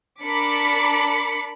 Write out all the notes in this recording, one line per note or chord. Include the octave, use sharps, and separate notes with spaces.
D4 A#4 B5 D6 B6 C#7